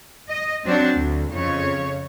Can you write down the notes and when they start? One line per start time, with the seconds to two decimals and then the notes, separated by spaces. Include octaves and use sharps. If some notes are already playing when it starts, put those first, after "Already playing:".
0.29 D#5
0.65 F#3 C4 D4 F#4
0.97 D2
1.32 F2 C#3 C#5